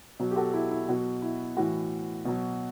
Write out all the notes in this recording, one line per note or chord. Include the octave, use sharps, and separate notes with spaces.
B2 F#3
G4
F#4 A4
E4 G4
E4
B2 F#3 F#4
E4
A2 E3 F#4
B2 F#3